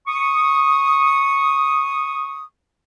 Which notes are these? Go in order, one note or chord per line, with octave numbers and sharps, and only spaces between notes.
C#6 D#6